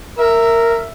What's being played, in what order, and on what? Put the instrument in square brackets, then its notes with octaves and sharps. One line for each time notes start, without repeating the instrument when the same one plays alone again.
[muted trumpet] A#4 [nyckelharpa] E5